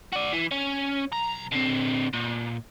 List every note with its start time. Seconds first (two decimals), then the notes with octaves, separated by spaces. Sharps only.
0.13 F#4 D5
0.33 E3
0.52 C#4
1.13 B1 A#5
1.53 D3 C4
2.14 A#2